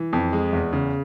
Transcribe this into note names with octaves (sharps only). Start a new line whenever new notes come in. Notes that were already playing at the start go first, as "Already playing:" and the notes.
Already playing: E3
F2
G#3
E2
C#3